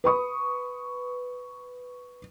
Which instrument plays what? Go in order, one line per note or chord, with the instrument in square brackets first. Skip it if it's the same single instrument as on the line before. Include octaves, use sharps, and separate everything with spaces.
[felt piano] B4 B5 C#6 D#6